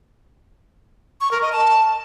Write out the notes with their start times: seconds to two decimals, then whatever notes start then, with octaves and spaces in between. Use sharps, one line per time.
1.21 C#6
1.31 A#4
1.42 D#5
1.52 A5